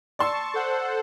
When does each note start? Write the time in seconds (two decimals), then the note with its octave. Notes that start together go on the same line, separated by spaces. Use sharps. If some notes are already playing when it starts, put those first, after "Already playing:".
0.19 D5 A5 C6 C#6 E6
0.54 A4 C5 F#5